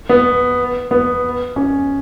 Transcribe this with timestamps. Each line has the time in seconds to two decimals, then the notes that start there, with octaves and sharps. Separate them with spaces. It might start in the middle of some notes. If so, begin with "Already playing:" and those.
0.09 B3
0.91 B3
1.56 C#4